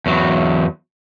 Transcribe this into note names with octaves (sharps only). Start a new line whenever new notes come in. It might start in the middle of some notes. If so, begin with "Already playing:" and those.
E2 F#3